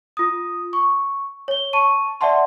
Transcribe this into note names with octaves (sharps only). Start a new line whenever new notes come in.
F4 D#6
C#6
C#5 G7
A5 C#6 D#7
D5 E5 F#5 A5 C6